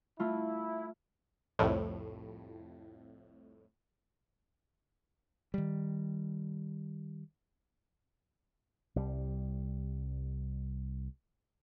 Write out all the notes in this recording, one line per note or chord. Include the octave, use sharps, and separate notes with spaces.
A3 E4 F4
C2 F2 A2
D#3 G3
C2 G3